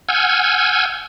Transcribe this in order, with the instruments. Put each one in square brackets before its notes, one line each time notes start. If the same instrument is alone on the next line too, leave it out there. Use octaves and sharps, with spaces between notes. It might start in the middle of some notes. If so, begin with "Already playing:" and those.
[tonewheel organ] F#5 G#5 E6 F6 G6 G#6